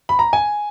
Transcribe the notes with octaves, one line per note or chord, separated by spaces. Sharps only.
B5
A#5
G#5